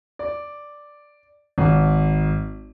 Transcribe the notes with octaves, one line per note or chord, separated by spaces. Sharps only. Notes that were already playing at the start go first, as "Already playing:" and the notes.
D5
G#1